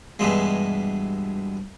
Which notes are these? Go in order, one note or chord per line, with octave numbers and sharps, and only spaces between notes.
G2 B2 E3 G#3